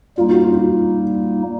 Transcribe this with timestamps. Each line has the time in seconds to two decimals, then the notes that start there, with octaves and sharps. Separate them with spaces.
0.18 G3 A#3 D#4 F4
0.30 F#4
0.44 F4
0.56 F4